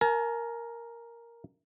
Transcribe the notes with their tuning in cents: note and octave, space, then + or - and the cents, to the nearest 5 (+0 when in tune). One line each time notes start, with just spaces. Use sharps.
A#4 +0 G#5 +45